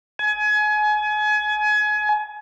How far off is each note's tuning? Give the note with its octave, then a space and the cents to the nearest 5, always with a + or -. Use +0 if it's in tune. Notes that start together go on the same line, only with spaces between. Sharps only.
G#5 +30